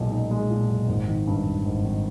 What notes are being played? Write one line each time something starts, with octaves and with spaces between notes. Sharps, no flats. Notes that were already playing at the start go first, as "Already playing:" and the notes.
Already playing: B1 A#2 G#3
D#4
G#3
A#2
B1
G#1
D#3
G2
G#1
G#1
D#3